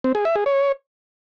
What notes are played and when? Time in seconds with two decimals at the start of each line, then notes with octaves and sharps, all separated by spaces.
0.04 C4
0.15 G#4
0.25 E5
0.36 G#4
0.46 C#5